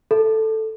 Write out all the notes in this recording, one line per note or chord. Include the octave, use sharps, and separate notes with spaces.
A4